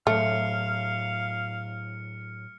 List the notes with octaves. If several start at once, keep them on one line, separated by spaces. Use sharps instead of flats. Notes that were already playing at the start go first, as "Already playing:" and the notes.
A2 F#3 A3 F5 F6 C#7